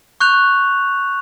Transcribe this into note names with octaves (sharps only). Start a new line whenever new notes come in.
C#6 F#6 G6 F7